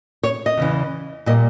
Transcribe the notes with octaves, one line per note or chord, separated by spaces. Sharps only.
C#5
D#5
E2 C#3 E3
A#2 G3 A#3 D#5